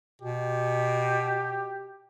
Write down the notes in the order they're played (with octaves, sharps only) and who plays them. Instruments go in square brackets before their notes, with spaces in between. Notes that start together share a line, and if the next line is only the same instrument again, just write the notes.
[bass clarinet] B2 [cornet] G4